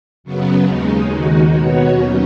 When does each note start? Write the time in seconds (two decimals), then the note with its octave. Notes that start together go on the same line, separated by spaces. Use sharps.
0.24 F#2 C#3 F#3 B3
0.66 D#2 C#3 G#3 D#4
1.08 D#2 D#3 G#3 D#4 F#4
1.50 B2 B3 F#4 C#5
1.92 D#2 D#3 F#3 C#4